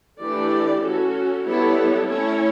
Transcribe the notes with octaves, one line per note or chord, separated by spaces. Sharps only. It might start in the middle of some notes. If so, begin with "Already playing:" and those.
E3 A3 D4 G4 D5
C#4 F#4 A4
G3 B3 E4 A4 C#5
A3 C#4 E4 A4 C#5